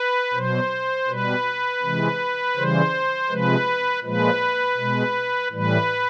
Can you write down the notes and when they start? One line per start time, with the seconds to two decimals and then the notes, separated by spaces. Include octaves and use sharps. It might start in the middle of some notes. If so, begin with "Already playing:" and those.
Already playing: B4
0.34 B2 F#3 C5
1.08 B2 G3 B4
1.83 C3 E3 G#3
2.56 C#3 E3 G3 C5
3.30 C3 F3 G#3 B4
4.04 A#2 F3 G#3 B4
4.77 B2 G#3
5.52 A2 E3 G3 B4